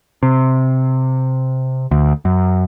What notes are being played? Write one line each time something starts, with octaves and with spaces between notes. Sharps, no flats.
C3
D2
F#2